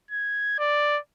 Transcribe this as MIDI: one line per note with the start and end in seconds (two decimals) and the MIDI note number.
0.11 0.55 92
0.59 0.99 74